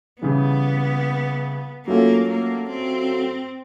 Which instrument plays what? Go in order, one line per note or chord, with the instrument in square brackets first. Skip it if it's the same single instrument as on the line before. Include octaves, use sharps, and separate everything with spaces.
[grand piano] C#3 E3 G3 [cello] B3
[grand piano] F#3 A3 C#4 F4 [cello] A#3
[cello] A#3
C4